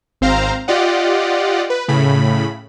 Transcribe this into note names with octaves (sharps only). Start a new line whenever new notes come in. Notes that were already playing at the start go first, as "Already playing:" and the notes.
G#1 C4 C5 F5 A#5
F4 G4 D5 D#5 F#5
B4
A2 C#3 B5